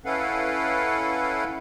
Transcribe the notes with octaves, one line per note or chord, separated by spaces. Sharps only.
C#4 E4 A4 B4 F5 F#5